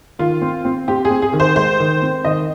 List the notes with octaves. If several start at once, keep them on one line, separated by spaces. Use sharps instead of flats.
D#3 F4
C4
C4
C4 G4
G#4
C4
G#4
D#3
C5
G#3 C5
D#3
C4
D#3 D#5